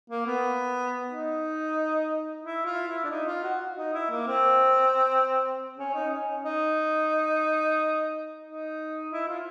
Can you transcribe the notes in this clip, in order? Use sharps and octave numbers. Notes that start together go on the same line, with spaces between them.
A#3
B3
D#4
E4
F4
E4
D4
D#4
F4
F#4
D#4
E4
A#3
C4
C#4
D#4
C#4
D#4
D#4
E4
F4